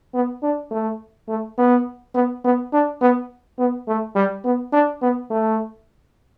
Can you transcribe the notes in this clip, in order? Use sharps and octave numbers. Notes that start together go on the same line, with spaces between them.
B3
D4
A3
A3
B3
B3
B3
D4
B3
B3
A3
G3
B3
D4
B3
A3